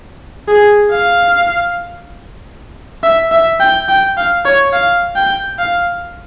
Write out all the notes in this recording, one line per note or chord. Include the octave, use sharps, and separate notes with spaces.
G#4
F5
E5
E5
G5
G5
F5
C#5
F5
G5
F5